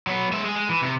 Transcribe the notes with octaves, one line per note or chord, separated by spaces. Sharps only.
F#3 B3
G#3 E5
G#3 G#4
G#3
E3
C3